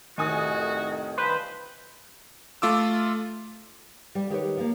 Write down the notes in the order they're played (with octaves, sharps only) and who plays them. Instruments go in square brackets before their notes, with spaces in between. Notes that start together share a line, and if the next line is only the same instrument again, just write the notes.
[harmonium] F2 A2 C3 [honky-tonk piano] D#3 G#5 D#6 [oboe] F#4
[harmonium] G3 D4 F4 [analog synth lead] B4 [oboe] C5
[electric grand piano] A3 F4 D6 E6
[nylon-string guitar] G3
D#3 G4 B4 C#5
F3 A#3